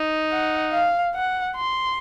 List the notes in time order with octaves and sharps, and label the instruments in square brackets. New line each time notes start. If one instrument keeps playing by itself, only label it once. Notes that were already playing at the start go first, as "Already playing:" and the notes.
Already playing: [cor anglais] D#4
[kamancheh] F#5
F5
F#5
C6